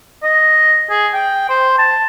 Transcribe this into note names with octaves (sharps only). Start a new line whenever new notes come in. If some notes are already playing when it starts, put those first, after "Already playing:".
D#5
G#4
G5
C5
A5